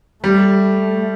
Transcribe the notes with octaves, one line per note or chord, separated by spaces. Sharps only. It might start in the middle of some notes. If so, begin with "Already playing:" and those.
G3 A3